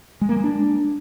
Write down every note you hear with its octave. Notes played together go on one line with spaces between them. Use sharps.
G#3
A#3
G#3
D4